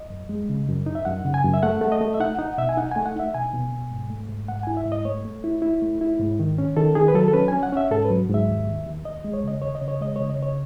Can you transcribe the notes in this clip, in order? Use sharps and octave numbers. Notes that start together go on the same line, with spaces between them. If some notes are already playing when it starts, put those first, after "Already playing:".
Already playing: D#5
F#2
G#3
C#3
F#2
D#4
E5
F#2 F#5
C#3
G#5
F#2
E5
A3 F#5
A3
D#5
A3
E5
D#4 F#5
D#4 F#5
B2 E5
G#5
D#4 F#5
A3 G#5
F#5
D#4 E5
B2 G#5
B2
B2
G#2
A3
G#2
G#2 F#5
E4 G#5
E5
G#2
D#5
A3 C#5
A3
E4
E4
A3
E4
G#2
D#3
C#4
D#3 A4
D#3 G#4
B4
F#3 A4
A4
C#4 B4
C#4 G#5
F#5
C#4 E5
G#2 A4
B4
F#3
G#2 E5
D#2
D#2
D#2
D#2 D#5
G#3
C#5
C#3 D#5
D#2 C#5
D#5
C#3
C#5
G#3 D#5
C#3 C#5
D#5
C#3 C#5